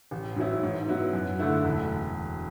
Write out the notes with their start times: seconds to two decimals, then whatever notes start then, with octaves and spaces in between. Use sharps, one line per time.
0.11 A1
0.36 G#2 F#3 C#4 E4
0.63 G#2
0.88 F#3 B3 E4
1.13 F#2
1.39 D3 A3 E4
1.65 E1